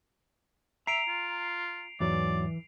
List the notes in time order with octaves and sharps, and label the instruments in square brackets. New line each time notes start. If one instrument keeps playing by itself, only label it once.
[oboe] E5 [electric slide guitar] A#5 [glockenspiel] C7 D7 F7
[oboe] F4
[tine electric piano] E2 G#2 F#3 [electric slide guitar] E3 [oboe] D5